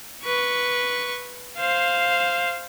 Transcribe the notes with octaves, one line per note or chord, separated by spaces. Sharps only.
B4 C#6
C5 F5